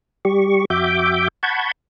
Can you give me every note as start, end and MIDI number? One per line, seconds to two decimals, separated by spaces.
0.25 0.65 55
0.25 0.65 67
0.25 0.65 85
0.70 1.28 41
0.70 1.28 66
0.70 1.28 76
0.70 1.28 79
0.70 1.28 86
0.70 1.28 91
1.43 1.71 78
1.43 1.71 81
1.43 1.71 83
1.43 1.71 85
1.43 1.71 91
1.43 1.71 92